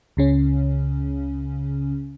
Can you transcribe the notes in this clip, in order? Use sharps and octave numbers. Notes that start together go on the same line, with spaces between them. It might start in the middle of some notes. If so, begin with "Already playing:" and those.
C#2 C#3 C#4